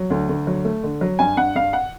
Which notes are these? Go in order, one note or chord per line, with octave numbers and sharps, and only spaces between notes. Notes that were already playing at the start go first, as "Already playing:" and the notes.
Already playing: F#3
D2
D2
F#3
A3
D3
F#3
G2 G#5
G2 F#5
G2 F5
F#5